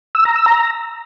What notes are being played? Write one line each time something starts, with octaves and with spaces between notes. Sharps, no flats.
E6
A#5
E6
A#5